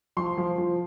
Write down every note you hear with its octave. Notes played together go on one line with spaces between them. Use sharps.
F3 C6
F3
F3